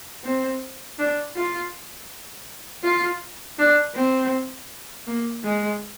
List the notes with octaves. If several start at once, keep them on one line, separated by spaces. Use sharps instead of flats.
C4
D4
F4
F4
D4
C4
A#3
G#3